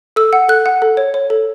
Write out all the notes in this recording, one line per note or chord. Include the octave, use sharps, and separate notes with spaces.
A4 E6
F#5
A4 F#6
F#5
A4
C#5
C#5
A4